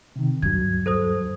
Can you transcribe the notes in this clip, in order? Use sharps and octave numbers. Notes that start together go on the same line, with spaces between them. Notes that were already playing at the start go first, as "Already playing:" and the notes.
C3 D#3
D2 G2 F#3 G#6
A4 C5 D#6